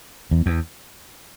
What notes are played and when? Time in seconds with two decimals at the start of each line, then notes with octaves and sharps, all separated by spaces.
0.31 E2
0.46 E2